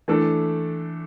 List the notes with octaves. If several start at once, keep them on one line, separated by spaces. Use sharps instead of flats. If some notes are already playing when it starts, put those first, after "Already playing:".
E3 A3 D4 A4